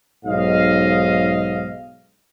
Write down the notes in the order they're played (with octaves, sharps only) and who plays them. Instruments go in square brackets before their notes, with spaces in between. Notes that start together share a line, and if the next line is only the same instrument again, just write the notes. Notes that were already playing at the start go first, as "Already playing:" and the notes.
[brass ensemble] B1 G#2 D#5 F5